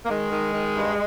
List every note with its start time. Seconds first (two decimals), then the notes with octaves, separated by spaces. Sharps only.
0.05 A#3
0.09 D#3 G#3
0.31 D#3
0.53 D#3
0.75 G2